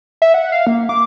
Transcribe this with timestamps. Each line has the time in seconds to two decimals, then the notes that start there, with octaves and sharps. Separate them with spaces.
0.22 E5
0.34 F#5
0.52 F5
0.67 A#3
0.89 D6